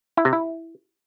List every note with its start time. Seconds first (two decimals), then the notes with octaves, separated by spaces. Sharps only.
0.17 E4
0.25 C3
0.33 E4